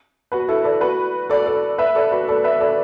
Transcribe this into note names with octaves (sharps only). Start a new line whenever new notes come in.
F#4 B4
E4 A4
A4 D5
F#4 B4
A4 D5
A4 D5
B4 E5
A4 D5
F#4 B4
A4 D5
B4 E5
A4 D5